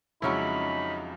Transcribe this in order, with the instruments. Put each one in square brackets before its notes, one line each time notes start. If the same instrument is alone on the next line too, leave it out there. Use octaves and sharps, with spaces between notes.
[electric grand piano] F2 C#3 G#3 [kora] F#3 C#4 E4 [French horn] D#4 [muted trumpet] B5